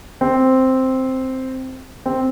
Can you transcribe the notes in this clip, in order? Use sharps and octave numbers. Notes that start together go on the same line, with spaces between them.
C4
C4